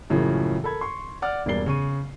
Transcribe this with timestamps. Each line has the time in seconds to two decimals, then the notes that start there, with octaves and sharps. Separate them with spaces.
0.10 F#2 A2 C#3 E3 F3 A#3
0.64 A4 A#4 B5 G#6
0.81 C6 C#6
1.22 D5 F#5 D6 F6
1.46 E1 G2 A#3 D5 C7 G7
1.66 C#3 C#6 D#7